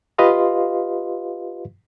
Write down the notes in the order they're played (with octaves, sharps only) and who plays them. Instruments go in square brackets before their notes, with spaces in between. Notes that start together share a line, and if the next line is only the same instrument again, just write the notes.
[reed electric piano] F4 G4 B4 D#5 F5 C6